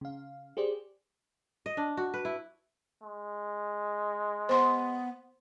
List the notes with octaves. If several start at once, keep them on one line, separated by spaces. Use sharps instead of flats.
C#3 F5
G4 G#4 C5 D5
D#5
D4
F#4
B4
E4
G#3
B3 C5 C6